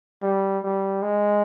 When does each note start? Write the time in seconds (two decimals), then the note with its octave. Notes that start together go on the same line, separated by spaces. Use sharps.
0.23 G3
0.64 G3
1.03 G#3